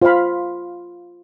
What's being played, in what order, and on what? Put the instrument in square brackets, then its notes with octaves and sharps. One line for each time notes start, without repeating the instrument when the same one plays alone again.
[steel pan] F4 C5 F5 B5